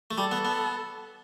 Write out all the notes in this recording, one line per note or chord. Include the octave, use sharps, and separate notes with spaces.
A3
G3 A4
B3
B3